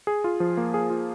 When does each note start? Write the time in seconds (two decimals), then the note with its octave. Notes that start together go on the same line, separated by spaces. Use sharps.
0.07 G#4
0.24 F4
0.40 F3
0.57 A#3
0.74 G#4
0.90 F4